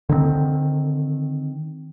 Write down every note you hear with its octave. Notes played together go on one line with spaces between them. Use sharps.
D3 D#3 G#3 C4